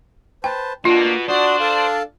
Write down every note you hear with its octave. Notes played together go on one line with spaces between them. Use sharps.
B4 C5 G5 A5
B2 A#3 D4 F4
D4 F#4 C5 D5 D#6
A4 F5 A5